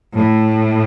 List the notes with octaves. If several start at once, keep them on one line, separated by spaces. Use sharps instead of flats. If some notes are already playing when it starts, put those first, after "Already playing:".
A2